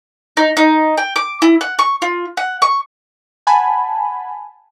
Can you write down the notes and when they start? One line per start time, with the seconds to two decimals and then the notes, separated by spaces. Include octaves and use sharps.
0.37 D#4
0.57 D#4
0.97 G5
1.16 D6
1.42 E4
1.61 F#5
1.79 C#6
2.02 F4
2.37 F#5
2.62 C#6
3.47 F#5 G#5 A5 B5